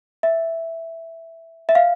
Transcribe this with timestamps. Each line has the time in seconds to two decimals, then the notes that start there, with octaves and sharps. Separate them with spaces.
0.23 E5
1.69 E5
1.75 F5